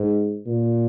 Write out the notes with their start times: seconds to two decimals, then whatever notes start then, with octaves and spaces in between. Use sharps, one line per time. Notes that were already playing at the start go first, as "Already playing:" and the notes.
Already playing: G#2
0.46 A#2